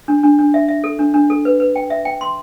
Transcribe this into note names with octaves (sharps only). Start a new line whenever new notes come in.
D4
D4
D4
E5
E5
A4
D4
D4
A4
B4
B4
G5
E5
G5
C6